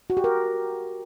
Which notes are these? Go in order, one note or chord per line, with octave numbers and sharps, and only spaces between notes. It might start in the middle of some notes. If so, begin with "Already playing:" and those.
F#4
G4
A#4